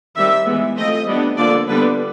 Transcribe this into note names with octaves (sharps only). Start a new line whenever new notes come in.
D#3 G3 C4 E5
E3 G#3 B3
F3 A3 C4 D#5
G3 B3 D4
D3 F3 A#3 D4 D5
D3 G3 B3 D4 B4